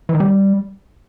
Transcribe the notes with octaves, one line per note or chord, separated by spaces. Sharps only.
E3
D#3
G3